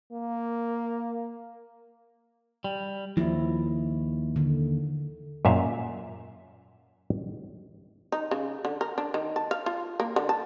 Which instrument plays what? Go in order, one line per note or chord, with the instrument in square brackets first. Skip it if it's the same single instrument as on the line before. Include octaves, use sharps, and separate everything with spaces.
[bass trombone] A#3
[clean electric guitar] G3
[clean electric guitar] D#2 [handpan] F3 E4
[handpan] D3
[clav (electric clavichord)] F#2 A#2 E5 F5
[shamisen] D#4
C#3
D3
A#4
D4
D#3
A5
F5
F4
A#3
D3
A5